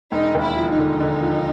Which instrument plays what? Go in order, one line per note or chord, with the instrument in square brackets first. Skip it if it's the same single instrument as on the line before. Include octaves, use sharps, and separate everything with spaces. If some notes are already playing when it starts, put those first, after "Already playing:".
[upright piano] E1 [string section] D#4
[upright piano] D#2
[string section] E4
[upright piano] F3
[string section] D#4
[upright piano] D3
D3
F3